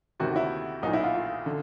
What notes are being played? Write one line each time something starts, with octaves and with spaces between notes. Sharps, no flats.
D2 C3 D#3 F#4
E4
B1 A#2 D#4
E4
F4
F4
D3